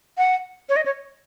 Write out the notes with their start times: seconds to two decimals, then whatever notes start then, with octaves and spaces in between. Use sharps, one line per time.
0.18 F#5
0.69 C#5
0.76 D#5
0.86 C#5